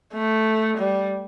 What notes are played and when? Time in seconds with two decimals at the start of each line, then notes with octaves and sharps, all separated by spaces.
0.14 A3
0.77 G3